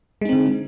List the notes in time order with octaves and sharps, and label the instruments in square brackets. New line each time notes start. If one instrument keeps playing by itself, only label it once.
[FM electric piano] G#3
D#4
C4
D3